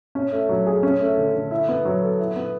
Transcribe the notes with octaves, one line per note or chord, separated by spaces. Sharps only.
C#4
A3
F#3
G#4
C#4
A3
D3
D3
E4
B3
F#3
A4
E4
B3